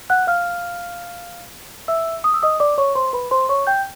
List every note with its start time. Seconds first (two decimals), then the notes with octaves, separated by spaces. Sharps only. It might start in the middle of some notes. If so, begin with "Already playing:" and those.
0.10 F#5 F#6
0.27 F5 F6
1.88 E5 E6
2.24 D#6
2.34 E6
2.43 D#5 D#6
2.60 D5 D6
2.78 C#5 C#6
2.95 C5 C6
3.13 B4 B5
3.31 C5 C6
3.49 C#5 C#6
3.67 G5 G6